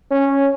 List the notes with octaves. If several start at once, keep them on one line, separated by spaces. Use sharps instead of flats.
C#4